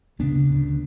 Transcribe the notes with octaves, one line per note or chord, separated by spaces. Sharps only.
D2 C#3 B3 D4
D2 C#3